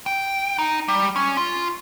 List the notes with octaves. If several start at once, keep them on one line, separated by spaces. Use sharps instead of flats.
G5
D#4
G3
C#4
F4